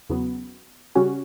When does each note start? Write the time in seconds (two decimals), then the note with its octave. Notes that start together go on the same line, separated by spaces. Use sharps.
0.10 E2 C#3 F#3 B3
0.95 C#3 G3 C#4 F#4